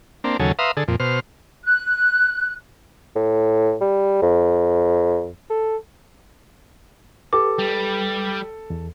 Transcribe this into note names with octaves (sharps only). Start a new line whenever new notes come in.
A#3 C4 D4
D#2 C#3 F#3 A4 G#5
B4 E5 F5 A#5 C6 D#6
D3 G#4 A4
F2 A#2
B2 C5 F6
F#6
A2
G3
F2
A4
G4 A4 B4 D6
G3
E2